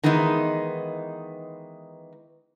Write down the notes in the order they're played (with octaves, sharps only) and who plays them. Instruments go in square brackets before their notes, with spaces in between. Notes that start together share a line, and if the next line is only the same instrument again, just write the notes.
[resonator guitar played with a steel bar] D#3 E3 G#3 B3 D#4